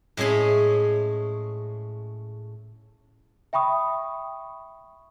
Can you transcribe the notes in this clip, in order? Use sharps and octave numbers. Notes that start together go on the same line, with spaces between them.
A2 G#3 C#4 G#4 B5
E5 G5 B5 C#6 D#6